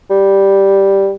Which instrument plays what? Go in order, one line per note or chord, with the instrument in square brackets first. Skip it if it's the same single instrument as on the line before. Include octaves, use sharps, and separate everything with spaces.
[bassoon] G3